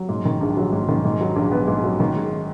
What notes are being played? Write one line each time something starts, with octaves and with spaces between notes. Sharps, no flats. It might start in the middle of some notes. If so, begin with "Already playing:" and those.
Already playing: F#3
G#2
D#3
A#1
F#3
G#2
D#3
G#2
F#3
A#1
B3
G#2
F#3
D#3
G#3